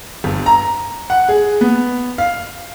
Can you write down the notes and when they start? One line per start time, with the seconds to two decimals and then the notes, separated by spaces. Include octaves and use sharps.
0.24 G1
0.46 A#5
1.10 F#5
1.29 G#4
1.61 B3
2.18 F5